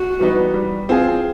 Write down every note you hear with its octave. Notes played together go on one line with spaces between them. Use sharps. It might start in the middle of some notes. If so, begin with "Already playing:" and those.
Already playing: F#4
E3 G3 B3 D#4
G3
C4 F4 G#4